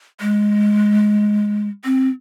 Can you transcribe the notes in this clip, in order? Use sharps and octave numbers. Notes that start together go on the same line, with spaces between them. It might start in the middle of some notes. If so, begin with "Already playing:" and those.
G#3
C4